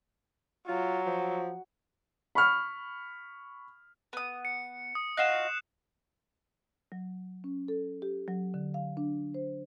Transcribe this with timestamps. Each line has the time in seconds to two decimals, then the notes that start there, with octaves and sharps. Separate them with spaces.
0.68 F#3 F4
1.06 F3
2.35 B5 C#6 F6
4.13 B3 D#6
4.45 C#7
4.95 D#6
5.17 D#4 F4 F#4 F#6 C7 E7
6.92 F#3
7.44 C#4
7.68 A4
8.02 G4
8.28 F#3
8.54 D3
8.74 F5
8.97 D4
9.34 C5